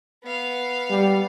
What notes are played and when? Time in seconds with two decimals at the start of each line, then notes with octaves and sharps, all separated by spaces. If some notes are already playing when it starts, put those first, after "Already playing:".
0.24 B3 F5
0.90 G3